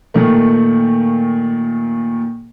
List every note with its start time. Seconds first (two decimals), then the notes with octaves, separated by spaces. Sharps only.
0.14 A#2 D#3 A3